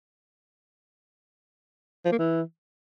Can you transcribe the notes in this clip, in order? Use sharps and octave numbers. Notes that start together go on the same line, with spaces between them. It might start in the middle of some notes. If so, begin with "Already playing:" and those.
F3
A#3
E3